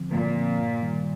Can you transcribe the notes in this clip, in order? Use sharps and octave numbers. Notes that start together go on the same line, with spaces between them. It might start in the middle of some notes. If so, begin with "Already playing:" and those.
Already playing: D3 F3 C4
A#2 D3
F3 C4
G2
D#3 G3